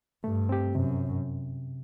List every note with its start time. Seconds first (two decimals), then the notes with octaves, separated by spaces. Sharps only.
0.24 G2 A3
0.49 C4 G4
0.75 F#2 C3